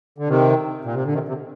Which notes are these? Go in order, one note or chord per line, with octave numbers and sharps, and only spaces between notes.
D3
C3 D#3
A#2
C3
D3
C3 D#3
C3